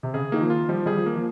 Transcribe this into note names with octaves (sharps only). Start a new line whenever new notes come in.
C3
C#3 G#4
D#3 A#3
F3
F4
F3 G3
G3 G#4
F3
A#3
F3